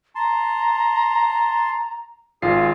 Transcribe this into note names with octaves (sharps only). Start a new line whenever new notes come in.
A5 A#5 C6
G#1 F4 G#4 C7